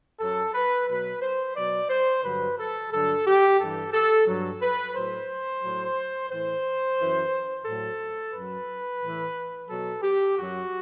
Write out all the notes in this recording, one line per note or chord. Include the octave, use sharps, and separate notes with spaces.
F#2 F#3 A4
B4
B2 F#3 B4
C5
B2 F#3 D5
C5
G2 D3 F#3 B4
A4
G2 D3 F#3 A4
G4
G2 E3 A4
A4
G2 F#3
B4
A2 F#3 C5
A2 F#3
A2 E3 C5
F#2 E3
A2 F#3 A4
F#2 F#3 B4
A2 E3
B2 F#3 A4
G4
F#2 F#3 F#4